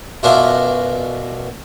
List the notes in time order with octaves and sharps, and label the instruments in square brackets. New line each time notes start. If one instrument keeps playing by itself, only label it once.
[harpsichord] F#2 B2 D4 E4 F4